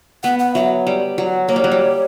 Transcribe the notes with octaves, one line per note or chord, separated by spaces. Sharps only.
B3 F#5
F#5
F#3 E5
G3
F#3
A#3 C#5
G3
F#3
G3